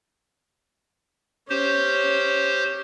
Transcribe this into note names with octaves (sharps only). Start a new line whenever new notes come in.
C#4 G4 C5